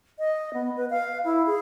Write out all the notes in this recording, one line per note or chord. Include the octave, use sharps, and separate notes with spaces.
D#5
B3
B4
F5
E4
G#4